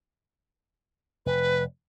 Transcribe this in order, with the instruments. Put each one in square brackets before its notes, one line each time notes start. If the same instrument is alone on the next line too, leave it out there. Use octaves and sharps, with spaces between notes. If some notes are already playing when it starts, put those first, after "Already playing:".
[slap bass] F1 [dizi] B4